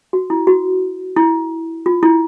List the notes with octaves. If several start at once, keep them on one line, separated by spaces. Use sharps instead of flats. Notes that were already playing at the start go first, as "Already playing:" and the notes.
F#4
E4
F#4
E4
F4
E4